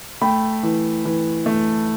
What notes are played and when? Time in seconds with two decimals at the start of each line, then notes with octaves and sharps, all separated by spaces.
0.21 A3 G5 B5
0.63 E3
1.05 E3
1.46 A3